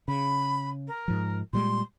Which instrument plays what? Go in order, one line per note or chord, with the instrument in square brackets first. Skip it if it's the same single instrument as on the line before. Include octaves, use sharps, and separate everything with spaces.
[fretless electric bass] C#3 [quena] B5
[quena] A#4
[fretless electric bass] G#2 F3
[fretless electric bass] A#2 G3 G#3 [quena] C6